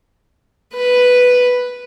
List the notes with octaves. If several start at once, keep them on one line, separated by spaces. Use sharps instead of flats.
B4